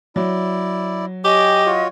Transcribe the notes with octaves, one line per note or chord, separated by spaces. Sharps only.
F#3 E4 D5
G4 C#5 D#5 G5 G#5
F4 F#4 C#5